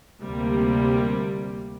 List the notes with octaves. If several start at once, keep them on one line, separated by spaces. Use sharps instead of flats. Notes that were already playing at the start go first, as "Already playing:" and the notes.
D2 C3 G3 A#3